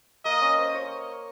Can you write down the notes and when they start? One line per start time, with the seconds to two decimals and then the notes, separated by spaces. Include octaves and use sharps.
0.25 A#3 D#5
0.41 C#4
0.58 C5
0.75 C#5